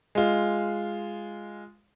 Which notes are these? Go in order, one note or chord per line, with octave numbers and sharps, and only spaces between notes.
G#3 F4